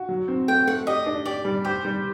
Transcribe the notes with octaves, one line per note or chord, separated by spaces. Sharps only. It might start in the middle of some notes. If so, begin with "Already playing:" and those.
Already playing: F#4
F#3
C4
A3 G5
A3 F#5
G4 D#5
D4
G4 D5
G3
G4 C5
G3